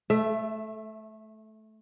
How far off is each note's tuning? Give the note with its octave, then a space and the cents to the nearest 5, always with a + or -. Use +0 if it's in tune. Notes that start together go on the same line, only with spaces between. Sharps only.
A3 -15 E5 +15